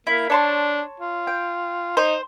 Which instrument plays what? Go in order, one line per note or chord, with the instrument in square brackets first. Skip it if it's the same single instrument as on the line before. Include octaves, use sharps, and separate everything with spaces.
[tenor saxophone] A#3 [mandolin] E4
[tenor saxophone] D4 [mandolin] C#5 A5 C6
[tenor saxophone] F4
[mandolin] G5
[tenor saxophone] D#4 [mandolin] C5